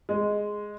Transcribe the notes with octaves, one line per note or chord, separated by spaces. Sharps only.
G#3